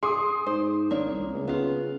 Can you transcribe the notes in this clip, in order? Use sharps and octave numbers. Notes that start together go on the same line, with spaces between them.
G#4 C6 D6 D#6
G#2 C5
G#1 A#3 D4 C#5
C2
C#2
C#3 B3 F4